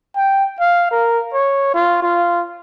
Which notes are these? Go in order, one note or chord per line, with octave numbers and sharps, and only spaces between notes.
G5
F5
A#4
C#5
F4
F4